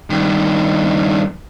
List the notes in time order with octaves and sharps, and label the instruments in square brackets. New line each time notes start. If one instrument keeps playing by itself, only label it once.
[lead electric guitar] G2 D#3